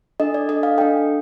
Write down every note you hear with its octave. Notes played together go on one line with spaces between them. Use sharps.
D4 A4 D#5
D5
D4 A4 D#5
F5
D4 A4 G5